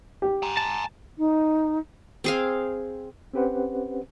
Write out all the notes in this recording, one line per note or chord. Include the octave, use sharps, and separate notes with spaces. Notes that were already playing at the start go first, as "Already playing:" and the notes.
G4
G#5 A#5
A5
D#4
C4 G#4 F5
C4 C#4 G4 B4 C5 F#5